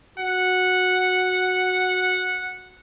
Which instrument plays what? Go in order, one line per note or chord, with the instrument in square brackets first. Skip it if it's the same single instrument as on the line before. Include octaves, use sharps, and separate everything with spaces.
[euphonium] F#4 [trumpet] F#5